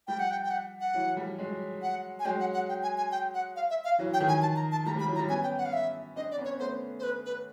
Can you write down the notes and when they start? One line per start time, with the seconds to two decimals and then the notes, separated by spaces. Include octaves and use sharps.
0.07 F3 G3 G5
0.19 F#5
0.31 G5
0.44 G5
0.51 F#5
0.80 F#5
0.94 E3 F#3
1.16 F3 G3
1.39 F#3 G#3
1.82 F#5
2.19 G#5
2.25 F#3 G#3 G5
2.40 F#5
2.54 F#5
2.69 G5
2.83 G#5
2.97 G#5
3.12 G5
3.34 F#5
3.56 F5
3.70 E5
3.84 F5
3.99 E3 F#3
4.13 G5
4.20 D#3 F3
4.28 G#5
4.42 A5
4.56 A#5
4.72 A5
4.86 F3 G3 A#5
4.96 F3 G3
5.00 B5
5.08 E3 F#3
5.15 A#5
5.18 F3 G3
5.29 B3 C#4 G#5
5.43 G5
5.58 F#5
5.66 F5
5.73 E5
6.16 C4 D4 D#5
6.31 D5
6.38 B3 C#4
6.45 C#5
6.59 A3 B3 C5
6.99 C5
7.03 B4
7.25 B4